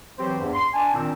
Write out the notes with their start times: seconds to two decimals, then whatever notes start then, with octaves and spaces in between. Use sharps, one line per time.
0.19 E3 F#3 C4 G4 C5
0.39 E2 G2
0.53 C6
0.74 D4 G#5
0.94 A#2 D#3 C4 D4 G5 E6